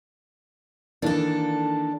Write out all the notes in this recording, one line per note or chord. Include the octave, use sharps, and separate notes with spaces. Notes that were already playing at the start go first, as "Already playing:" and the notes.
D#3 E3 A#3 D4 A4